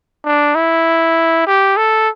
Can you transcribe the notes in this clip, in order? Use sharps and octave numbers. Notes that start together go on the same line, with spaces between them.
D4
E4
G4
A4